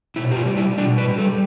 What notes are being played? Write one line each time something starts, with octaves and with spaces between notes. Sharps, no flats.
B2 E4
G4
F4
G3
E4
B2 D4
B4
G3
A4